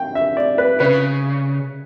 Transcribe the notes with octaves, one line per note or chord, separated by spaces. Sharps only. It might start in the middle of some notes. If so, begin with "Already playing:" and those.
Already playing: G5
E5
D5
B4
C#3 B4